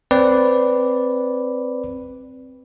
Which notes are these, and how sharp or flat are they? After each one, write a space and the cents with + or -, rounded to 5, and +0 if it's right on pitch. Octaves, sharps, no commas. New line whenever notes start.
C4 +0 B4 +0 D5 -10